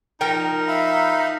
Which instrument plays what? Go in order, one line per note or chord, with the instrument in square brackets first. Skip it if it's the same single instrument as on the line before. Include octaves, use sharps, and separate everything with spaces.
[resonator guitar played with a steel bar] F3 A#4 G5 [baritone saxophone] D#4
[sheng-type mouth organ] E5 F5 B5